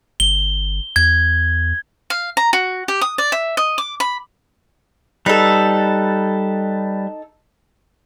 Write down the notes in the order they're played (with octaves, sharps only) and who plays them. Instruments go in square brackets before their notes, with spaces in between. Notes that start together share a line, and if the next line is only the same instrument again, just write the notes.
[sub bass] G1 [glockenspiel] G7
[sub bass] E2 [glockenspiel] G#6
[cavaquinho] F5
A#5
F#4
G4
D#6
D5
E5
D#5
D6
B5
[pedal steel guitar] G3 B4 [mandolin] D#4 A4